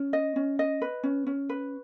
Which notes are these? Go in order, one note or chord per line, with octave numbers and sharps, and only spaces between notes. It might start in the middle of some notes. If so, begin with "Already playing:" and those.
Already playing: C#4
D#5
C#4
D#5
B4
C#4
C#4
B4